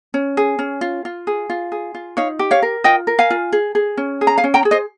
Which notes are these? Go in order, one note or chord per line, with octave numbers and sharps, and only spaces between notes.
C#4
G#4
C#4
F4
F4
G#4
F4
G#4
F4
D#4 C#5 F5
G4
C#5 F5
A#4
F4 D#5 G5
A#4
F5 G#5
F4
G#4
G#4
C#4
G#4
A#5
F5 G#5
C#4
G5 A#5
G#4
C5 D#5